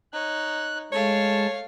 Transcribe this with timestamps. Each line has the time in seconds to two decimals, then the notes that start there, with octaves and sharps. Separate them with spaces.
0.13 D#4 C#5 F#6
0.92 G#3 A3 C#5 F5 A5